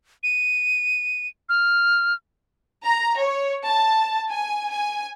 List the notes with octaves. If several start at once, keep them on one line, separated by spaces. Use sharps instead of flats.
D#7
F6
A#5
C#5
A5
G#5
G#5